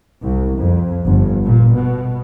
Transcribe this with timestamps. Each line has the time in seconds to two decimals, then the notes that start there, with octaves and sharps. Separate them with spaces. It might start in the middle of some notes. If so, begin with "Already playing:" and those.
0.22 C2
0.57 F2
1.05 G1
1.45 A#2
1.75 B2